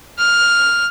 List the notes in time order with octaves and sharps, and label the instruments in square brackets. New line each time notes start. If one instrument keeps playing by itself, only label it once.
[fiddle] F6